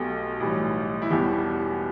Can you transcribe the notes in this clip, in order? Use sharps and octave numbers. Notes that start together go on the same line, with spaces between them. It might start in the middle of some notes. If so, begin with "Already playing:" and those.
Already playing: B1 B2 A3 G4
B1 A2 E3 G3
E4
E1 E2 B2 G3 B3 G4